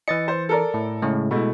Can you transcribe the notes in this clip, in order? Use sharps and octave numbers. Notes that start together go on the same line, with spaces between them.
E3 D#5 A6 C#7
C5
A4 A#4 D5
A2
A2 C#3 G#3
B2 G#3 A3 E4